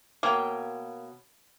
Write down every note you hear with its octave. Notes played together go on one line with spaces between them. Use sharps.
B2 A#3 C#5 G5